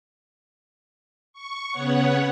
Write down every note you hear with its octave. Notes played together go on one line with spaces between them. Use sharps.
C#6
C#3 B3 C#5 F#5